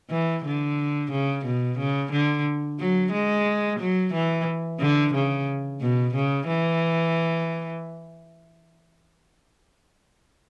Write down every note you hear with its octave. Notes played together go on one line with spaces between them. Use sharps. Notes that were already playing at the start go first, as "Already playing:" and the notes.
E3
D3
C#3
B2
C#3
D3
F#3
G#3
F#3
E3
D3
C#3
B2
C#3
E3